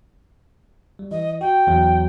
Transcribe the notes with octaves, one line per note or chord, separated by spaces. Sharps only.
G3
E3 D#5
F#4 G5
E2 F#3